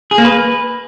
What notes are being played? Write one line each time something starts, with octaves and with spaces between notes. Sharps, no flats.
G#4
A#3
B4